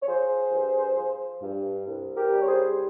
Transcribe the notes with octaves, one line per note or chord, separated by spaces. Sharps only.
C#5
F3 G#4 C5
G2
F3
G2
C2
G4 A#4
G3
C#5
G#4 C5